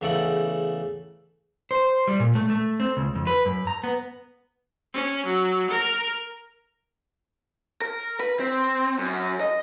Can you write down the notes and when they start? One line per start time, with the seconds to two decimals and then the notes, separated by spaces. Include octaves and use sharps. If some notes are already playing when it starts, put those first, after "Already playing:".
0.01 E2 C#3 A3 A4 D5 F#5
1.71 C5
2.08 G3
2.20 A#2
2.35 A3
2.50 A3
2.80 C4
2.97 C#2
3.15 F2
3.27 B4
3.46 F#2
3.67 A#5
3.84 B3
4.93 C#4
5.25 F#3
5.70 A#4
7.82 A#4
8.20 B4
8.40 C4
8.99 F#2
9.41 D#5